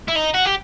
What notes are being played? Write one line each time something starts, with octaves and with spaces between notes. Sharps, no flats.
E4
D#4
F#4
G4